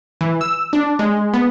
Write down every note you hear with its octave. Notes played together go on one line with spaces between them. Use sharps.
E3
E6
D4
G#3
B3